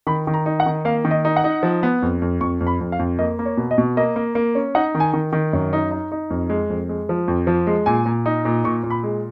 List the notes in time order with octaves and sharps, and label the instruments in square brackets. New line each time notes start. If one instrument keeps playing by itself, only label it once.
[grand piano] D#3 B5
D#3
A#5
D#4
F#5
D#3
A#3 F5
D#3
D#5
D#4
F#5
D#4
F3
B3
F2
F2
F2 C#6
F2
B5
F2
F5
F2
A#3 D#5
A#3
C#5
B2
D#5
B2
A#3 D#5
A#3
A#3
C#4
D#4 F#5
D#3
G#5
D#3
D#3
F#2
D#4
D#4
D#4
F2
G#3
F2
G#3
F3
F2
F3
G#3
A#2 G#5
A#2
D#4
A#2
A#2 C#6
A#2
B5
G#3